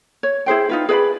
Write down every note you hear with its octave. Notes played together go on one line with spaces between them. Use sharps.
C#5
E4 G#4 C5 G5
D#4 F4 B4
G#4 B4 D5 B5